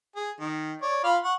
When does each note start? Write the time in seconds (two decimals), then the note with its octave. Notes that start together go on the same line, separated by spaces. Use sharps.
0.16 G#4
0.40 D#3
0.82 C#5 D5
1.04 F4 F5 B5
1.24 F#5 C#6